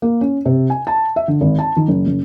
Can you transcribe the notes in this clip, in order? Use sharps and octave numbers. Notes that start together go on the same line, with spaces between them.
A#3
C#4
C3
G#5
A5
E5
D3
G#1
A5
D#3
F#1
F#1